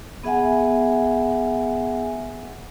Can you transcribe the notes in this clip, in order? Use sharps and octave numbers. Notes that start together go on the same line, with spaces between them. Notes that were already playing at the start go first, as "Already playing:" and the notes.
B3 G#4 E5 F#5 G#5